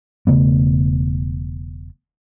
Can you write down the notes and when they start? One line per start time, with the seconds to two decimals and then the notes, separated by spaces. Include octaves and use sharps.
0.27 E1 C#3 A3 B3